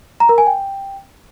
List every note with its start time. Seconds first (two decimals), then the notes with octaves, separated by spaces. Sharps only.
0.20 A#5
0.29 A#4
0.38 G#5
0.47 G5